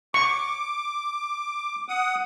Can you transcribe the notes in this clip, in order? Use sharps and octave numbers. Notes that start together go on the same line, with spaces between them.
C#6 D6
F#5 D#6